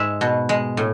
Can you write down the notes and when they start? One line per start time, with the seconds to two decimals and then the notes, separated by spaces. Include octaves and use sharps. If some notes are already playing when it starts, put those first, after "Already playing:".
Already playing: G#2 G#3 E5
0.21 B2
0.49 G#3
0.77 A2